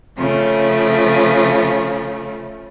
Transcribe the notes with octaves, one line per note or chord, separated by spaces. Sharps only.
C#3 F3 A3